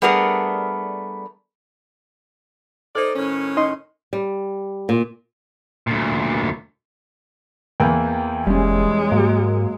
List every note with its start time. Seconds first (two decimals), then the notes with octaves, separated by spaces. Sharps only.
0.02 G3 A3 B3 D4 G#4 A#4
2.95 D#4 A4 C5 D5
3.15 A2 D#3 C#4
3.57 D#4 D#5 C6
4.13 G3
4.89 A#2
5.87 D2 A#2
7.80 E2 E3 A#3 G5
8.47 F1 G3 G#3 C#4
9.12 G#2 F#3 A#3